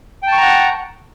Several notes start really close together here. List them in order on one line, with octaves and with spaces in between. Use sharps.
G5 A5 C#6 A#5 F#5